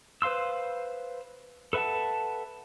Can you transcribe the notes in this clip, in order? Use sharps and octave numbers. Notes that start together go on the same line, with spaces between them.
B4 C5 F5 C6 E6
A4 B4 E5 F#5 A5